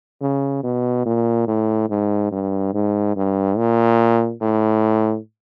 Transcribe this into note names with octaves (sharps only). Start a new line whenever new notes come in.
C#3
B2
A#2
A2
G#2
G2
G#2
G2
A#2
A2